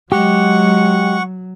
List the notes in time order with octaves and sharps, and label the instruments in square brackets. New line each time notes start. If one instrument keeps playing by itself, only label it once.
[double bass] F#3 [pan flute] G#3 [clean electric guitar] G4 [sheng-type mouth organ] F#5 C#6